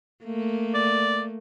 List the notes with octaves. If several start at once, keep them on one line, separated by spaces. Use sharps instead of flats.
A3 A#3
D5